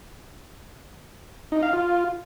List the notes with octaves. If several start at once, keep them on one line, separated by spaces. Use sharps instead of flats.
D#4
F5
F4